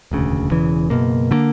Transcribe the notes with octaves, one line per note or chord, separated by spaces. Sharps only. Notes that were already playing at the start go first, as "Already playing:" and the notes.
E1 D2 C#3
E1 E2 C#3 E3
F#1 E2 B2 A#3
D3 G3 A#3